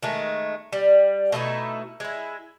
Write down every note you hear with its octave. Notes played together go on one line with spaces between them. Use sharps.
D#3 G#3 A3
G3
B2 A3 D#4 E4
G#3 E4